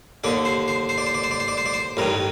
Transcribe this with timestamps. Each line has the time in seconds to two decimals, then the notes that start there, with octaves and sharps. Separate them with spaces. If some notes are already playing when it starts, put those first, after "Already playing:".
0.24 D#2 D3 D5
0.45 C5
0.68 C5
0.89 C5
0.98 D5
1.06 C5
1.14 D5
1.24 C5
1.31 D5
1.40 C5
1.48 D5
1.57 C5
1.66 D5
1.74 C5
1.97 A1 G2 D#3 A#4